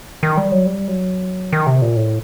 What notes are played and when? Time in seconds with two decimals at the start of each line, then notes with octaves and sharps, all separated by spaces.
0.23 D#3
0.37 G3
0.52 F#3
0.66 G3
0.88 F#3
1.53 D#3
1.67 C3
1.82 A#2
1.96 A2